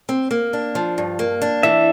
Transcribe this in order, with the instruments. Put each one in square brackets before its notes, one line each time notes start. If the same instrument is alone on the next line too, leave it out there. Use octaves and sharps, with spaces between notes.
[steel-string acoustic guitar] C4
A#3
D4
F3
G2
A#3
D4
[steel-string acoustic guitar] E3 [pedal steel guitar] E5